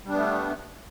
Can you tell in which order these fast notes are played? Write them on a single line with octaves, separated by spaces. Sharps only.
G3 D4 B3 A3